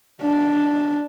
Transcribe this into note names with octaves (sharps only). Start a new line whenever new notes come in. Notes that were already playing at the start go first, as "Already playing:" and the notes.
D4